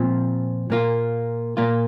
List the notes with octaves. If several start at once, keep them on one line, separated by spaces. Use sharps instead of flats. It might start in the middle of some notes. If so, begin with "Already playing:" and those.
Already playing: A#2 F3 C4
A#2 A#3 F4
A#2 A#3 F4